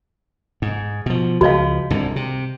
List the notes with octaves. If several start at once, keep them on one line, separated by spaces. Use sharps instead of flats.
G#2
B2 F3
C#2 F3 F#4 D#5 F5
C2 G#2 D3
C3